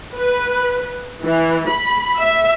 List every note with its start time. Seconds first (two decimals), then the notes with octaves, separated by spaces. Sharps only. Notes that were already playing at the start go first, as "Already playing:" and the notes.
0.15 B4
1.23 E3
1.69 B5
2.19 E5